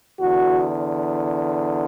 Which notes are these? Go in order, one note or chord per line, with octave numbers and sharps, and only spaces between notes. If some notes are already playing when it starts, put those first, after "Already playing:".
E2 D3 F#4